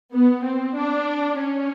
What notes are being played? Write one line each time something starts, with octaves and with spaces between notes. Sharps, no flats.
B3
C4
D4
C#4